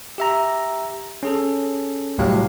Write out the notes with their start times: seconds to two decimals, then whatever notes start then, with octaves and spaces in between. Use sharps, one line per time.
0.18 G4 E5 A#5
1.23 C#4 G#4 A4
2.18 C2 A2 F#3 G4 F5